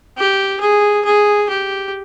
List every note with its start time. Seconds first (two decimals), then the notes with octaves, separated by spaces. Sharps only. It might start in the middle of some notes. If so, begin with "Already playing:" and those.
0.18 G4
0.61 G#4
1.05 G#4
1.50 G4